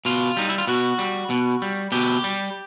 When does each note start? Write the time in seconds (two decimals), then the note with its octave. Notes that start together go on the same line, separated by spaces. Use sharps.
0.05 B2 F4
0.37 G3 D#4
0.49 E4
0.58 F4
0.67 B2 F#4
0.98 G3
1.30 B2
1.62 G3
1.92 B2 G4
2.24 G3